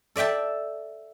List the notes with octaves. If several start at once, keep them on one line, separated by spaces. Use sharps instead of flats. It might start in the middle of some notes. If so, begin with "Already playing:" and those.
A4 D5 E5 G5 A5